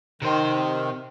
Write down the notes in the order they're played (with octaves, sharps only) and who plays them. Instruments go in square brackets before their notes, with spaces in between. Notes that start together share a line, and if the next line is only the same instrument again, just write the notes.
[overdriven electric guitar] C3 C5 [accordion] D#3